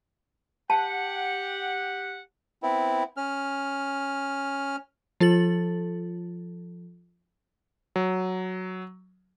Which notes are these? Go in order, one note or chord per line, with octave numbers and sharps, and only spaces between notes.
G4 F#5 A5
B3 C4 E4
C#4 F6
F3 F4 A4 A6 F#7
F#3